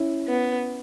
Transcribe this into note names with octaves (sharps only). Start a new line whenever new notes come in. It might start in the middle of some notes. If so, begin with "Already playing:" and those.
Already playing: C#4 E4
B3